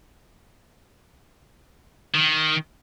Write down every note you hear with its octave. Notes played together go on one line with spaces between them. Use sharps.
D#3